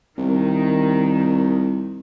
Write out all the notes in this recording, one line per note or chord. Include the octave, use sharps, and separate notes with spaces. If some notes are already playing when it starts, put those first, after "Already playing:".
C2 D#3